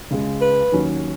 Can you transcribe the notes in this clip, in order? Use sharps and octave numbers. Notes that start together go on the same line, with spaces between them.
C#2 C#3 G#3
B4
D#2 D#3 F#3 C#4